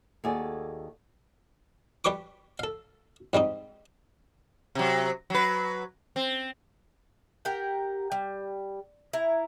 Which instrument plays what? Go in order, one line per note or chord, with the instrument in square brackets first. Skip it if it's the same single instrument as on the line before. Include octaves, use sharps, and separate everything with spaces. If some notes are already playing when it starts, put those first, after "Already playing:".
[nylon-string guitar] D#2 F#4 G#4 A4 D5
[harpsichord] G3 G4 B4 C#6 D6
A4 F5
G#2 G3 C4 D#4
[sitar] C3 F#3
F#3 B4
C4
[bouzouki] G4 A#4 F#5
G3
E4 A#5